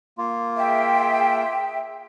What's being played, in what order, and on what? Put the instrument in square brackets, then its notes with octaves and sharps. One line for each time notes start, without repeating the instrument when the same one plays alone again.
[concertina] A#3 F4
[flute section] G#4 E5 G5